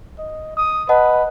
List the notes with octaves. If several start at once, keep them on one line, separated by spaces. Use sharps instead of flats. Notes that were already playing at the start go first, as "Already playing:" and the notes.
D#5
D#6
B4 D#5 F#5 A5